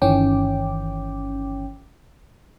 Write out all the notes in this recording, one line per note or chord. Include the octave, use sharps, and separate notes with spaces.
G1 D#3 E3 C#4 G5 D6